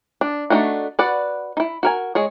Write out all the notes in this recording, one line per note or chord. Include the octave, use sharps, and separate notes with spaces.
D4
A3 A#3 D4 D#4 F#4
F#4 B4 D5 F#5
D#4 E4
F#4 A#4 G#5
G#3 G#4 C#5